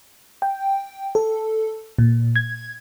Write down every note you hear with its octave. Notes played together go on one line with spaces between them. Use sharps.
G5
A4
A#2
G#6